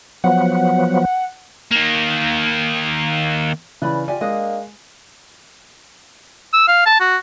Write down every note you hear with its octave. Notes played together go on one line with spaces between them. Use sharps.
F3 F#3 B3 F#5
D#3 A#3
C#3 E3 B4 D5 B5
F4 G4 D5 G#5
G#3 A#3 D4 D#5
E6
F5
A5
F#4